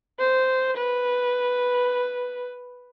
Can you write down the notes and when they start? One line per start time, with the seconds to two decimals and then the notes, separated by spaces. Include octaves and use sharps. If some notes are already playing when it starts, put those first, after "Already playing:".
0.19 C5
0.77 B4